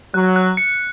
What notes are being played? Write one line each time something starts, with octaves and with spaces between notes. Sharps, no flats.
F#3 F#6
F#6
C#7